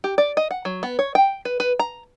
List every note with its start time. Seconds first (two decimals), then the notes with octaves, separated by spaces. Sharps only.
0.04 G4
0.18 D5
0.37 D#5
0.51 F#5
0.65 F#3
0.83 B3
0.99 C#5
1.15 G5
1.45 B4
1.60 B4
1.79 A#5